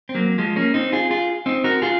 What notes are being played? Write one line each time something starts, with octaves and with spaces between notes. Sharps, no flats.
C4
F#3 A#3
F3 G#3
A#3 C#4
C4 D#4
F4 G#4
F4 G#4
C4 D#4
F#4 A#4
F4 G#4